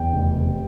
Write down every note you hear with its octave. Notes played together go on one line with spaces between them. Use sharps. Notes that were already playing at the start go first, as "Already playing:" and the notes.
Already playing: E2 G5
F1
C3